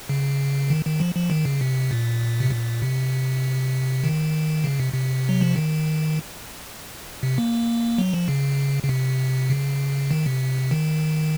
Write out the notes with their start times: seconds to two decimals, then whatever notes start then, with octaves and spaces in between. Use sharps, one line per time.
0.09 C#3
0.70 D#3
0.85 D#3
1.00 F3
1.15 F3
1.30 D#3
1.45 C#3
1.61 C3
1.91 A#2
2.40 C3
2.51 A#2
2.82 C3
4.04 D#3
4.64 C#3
4.80 C3
4.94 C3
5.29 F#3
5.41 F3
5.56 D#3
7.23 C3
7.38 A#3
7.98 F#3
8.13 F3
8.28 C#3
8.83 C#3
8.89 C3
9.50 C#3
10.11 D#3
10.26 C3
10.71 D#3